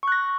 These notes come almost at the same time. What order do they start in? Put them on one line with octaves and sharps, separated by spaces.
C#6 F#6 A#6